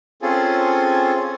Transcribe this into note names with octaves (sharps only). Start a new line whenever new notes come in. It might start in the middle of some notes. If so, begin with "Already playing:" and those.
C4 C#4 F4 G#4 A4